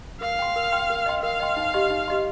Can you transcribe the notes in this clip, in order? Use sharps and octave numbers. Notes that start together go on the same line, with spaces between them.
A#4 F5
G5 C6
A#4
G5 C6
A#4
D#5 G5 C6
A#4 F5
D#5 G5 C6
D#4
G4 D#5 C6
D#4
G4 D#5 C6